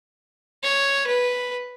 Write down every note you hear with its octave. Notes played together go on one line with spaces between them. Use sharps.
C#5
B4